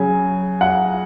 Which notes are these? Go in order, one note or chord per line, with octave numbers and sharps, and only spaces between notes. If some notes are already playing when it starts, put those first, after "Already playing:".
Already playing: C#3 F#3 G#5
F#5